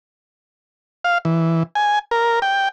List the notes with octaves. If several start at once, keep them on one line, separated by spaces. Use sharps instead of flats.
F5
E3
G#5
A#4
G5